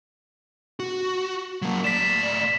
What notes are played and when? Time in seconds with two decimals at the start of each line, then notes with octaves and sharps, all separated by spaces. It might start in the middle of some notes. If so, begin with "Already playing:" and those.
0.80 F#4
1.62 F#3 A#3
1.84 A2 D5 B6 E7